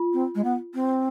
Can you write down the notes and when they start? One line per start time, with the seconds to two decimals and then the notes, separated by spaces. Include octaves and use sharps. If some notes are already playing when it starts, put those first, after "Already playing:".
Already playing: F4
0.13 C4
0.35 G#3
0.44 B3
0.74 C4